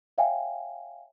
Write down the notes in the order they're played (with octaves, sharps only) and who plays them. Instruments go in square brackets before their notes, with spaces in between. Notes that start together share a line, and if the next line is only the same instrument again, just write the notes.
[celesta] C#5 E5 F5 G5 G#5